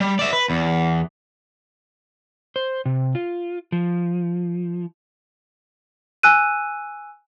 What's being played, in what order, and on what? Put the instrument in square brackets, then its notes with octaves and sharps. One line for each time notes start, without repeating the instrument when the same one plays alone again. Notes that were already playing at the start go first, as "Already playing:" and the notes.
[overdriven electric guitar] G3
D5 E5
B4
E2
[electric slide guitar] C5
C3
F4
F3
[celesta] G#5 E6 F#6 D#7